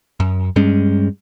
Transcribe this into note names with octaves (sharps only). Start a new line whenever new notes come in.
F#2
G2 G3 G#3 C#4